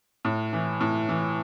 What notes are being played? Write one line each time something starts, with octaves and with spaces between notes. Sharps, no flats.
A2
E3
A2
E3